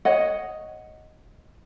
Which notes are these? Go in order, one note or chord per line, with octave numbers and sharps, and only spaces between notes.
C#5 D#5 F#5